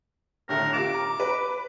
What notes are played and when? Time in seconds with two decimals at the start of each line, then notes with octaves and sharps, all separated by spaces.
0.49 A2 D3 A3 A#4
0.73 C3 F4 D6 E7
0.94 A#5
1.20 B4